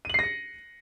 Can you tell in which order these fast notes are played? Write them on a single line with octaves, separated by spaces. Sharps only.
D#7 F#7 C7 A#6 C#7